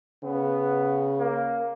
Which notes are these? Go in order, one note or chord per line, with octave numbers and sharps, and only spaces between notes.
C#3 B3
A#3